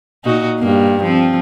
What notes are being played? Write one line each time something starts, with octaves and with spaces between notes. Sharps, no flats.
A#2 D#4 F#4
G2 A#3
F3 C4